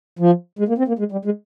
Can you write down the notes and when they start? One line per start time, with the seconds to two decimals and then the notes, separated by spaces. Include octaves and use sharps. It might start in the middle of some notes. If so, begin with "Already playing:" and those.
0.19 F3
0.59 G#3
0.68 A#3
0.78 C4
0.88 A#3
0.99 G#3
1.12 G3
1.25 G#3